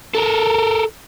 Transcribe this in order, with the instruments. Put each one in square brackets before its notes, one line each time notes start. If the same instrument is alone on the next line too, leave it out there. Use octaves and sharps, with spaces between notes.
[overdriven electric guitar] A4 A#4